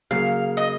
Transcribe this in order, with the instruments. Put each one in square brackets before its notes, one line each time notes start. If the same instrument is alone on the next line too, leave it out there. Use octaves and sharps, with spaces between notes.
[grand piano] C#3 F#3 A#3 [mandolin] F5
[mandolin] D#5